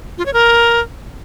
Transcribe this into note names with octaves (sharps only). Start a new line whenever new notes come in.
F4
C#5
A#4